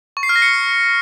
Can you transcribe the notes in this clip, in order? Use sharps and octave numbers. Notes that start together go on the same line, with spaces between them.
C#6
C7
F6
A#6
C#7